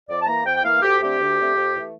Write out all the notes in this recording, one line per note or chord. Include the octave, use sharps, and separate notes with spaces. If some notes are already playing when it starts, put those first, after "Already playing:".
F2 D5
A5
E3 A#3 A#5
F2 G5
G5
E3 A#3 F5
D2 G4
D3 A3 C4 G4
D2
D3 A3 C4
F2
E3 A3